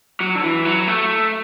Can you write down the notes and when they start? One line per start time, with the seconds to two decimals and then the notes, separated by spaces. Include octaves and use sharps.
0.21 F#3
0.35 D3
0.43 E3
0.65 F#3
0.87 A3